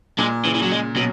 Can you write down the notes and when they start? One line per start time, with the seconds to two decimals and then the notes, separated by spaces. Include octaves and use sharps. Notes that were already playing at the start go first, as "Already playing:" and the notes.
0.19 A#2 G#3
0.44 C#3 E3
0.55 E3
0.63 F#3
0.71 G#3
0.96 B2 F#3